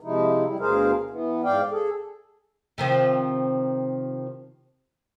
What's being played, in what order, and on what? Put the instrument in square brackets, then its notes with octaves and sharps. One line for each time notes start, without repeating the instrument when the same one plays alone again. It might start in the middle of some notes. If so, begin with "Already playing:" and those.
[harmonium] C3 F3 G#3 D#4 E4
G3 E4
D2 B2 G#4 A#4 C5 F5
E3 B3
G#2 D5 F5 G5
G#4 A4
[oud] C3 D#3 F3